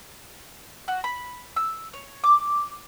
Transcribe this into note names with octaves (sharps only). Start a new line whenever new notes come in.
F#4
B5
E6
C#5
D6